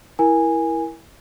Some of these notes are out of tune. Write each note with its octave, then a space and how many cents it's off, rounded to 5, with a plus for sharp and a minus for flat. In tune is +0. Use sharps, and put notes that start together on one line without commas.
E4 +0 A#4 +15 G#5 -10